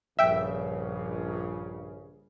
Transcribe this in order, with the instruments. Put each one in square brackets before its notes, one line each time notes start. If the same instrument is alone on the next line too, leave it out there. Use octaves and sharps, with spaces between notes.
[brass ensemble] A#1 G2 C#3 [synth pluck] E5 G5